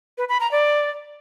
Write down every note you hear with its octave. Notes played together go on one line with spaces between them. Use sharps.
B4
B5
A#5
D5